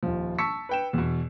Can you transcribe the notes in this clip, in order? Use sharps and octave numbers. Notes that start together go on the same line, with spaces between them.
D#1 F3
A5 C#6 E6 B6 C#7
B4 G5 E7
E2 B2